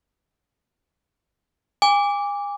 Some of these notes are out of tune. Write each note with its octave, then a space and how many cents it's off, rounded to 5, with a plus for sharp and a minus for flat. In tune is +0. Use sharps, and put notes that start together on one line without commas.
G#5 -35 D6 -10